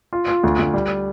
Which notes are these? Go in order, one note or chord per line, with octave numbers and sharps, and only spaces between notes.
F4
F4
D2
D2
G3